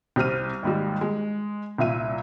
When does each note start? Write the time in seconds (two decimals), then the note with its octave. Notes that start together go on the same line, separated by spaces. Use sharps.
0.16 C2 G4 C5 F6 D#7
0.63 D#2 G#2 G3
1.01 G#3
1.78 C2 A#2 E5 D#7